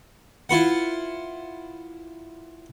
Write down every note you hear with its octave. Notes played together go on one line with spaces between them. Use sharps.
E4 F4 B4 F#5